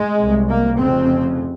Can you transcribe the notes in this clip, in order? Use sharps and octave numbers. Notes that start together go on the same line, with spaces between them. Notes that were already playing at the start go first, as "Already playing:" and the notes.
Already playing: G#3
C2 C3
A#3
F1 F2 C#3 C4